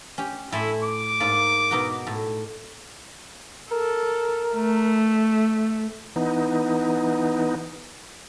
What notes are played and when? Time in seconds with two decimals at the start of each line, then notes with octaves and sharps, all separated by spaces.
0.18 C#4 G4
0.52 A2 E4 G#5 C6
0.83 D6
1.20 G#2 A#3 D5
1.71 B2 D#4 F#4
2.07 A2
3.71 A4 A#4
4.55 A3
6.16 E3 B3 D#4